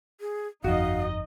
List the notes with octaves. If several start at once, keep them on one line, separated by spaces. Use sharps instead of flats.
G#4
G1 F2 D#4 F#4 D#5 F5